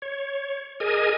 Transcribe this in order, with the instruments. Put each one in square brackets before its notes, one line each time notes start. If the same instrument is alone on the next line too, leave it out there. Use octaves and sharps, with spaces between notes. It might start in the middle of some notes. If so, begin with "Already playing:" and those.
[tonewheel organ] C#5
G#4 A#4 D#5 G#5